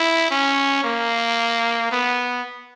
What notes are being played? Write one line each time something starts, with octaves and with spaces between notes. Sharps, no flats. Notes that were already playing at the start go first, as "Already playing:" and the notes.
Already playing: E4
C#4
A#3
B3